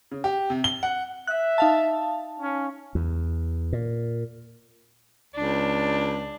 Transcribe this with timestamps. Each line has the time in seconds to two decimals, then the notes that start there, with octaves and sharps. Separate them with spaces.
0.11 C#3
0.24 G4
0.50 C3
0.64 G7
0.83 F#5
1.27 E5 F#6
1.58 D#4 F5 A5
2.39 C#4
2.95 E2
3.73 A#2
5.34 C#2 D4